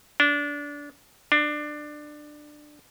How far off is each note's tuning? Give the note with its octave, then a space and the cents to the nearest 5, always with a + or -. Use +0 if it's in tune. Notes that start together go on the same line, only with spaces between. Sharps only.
D4 -20
D4 +20